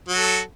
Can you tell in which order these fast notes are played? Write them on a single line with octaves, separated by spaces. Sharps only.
F#3 F#4 A4